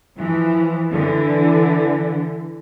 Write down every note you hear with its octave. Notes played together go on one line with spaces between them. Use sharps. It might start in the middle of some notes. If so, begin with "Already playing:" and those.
E3 F3
D3 E3